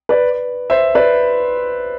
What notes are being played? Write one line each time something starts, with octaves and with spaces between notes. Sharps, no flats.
B4 D5
C5 E5
B4 D5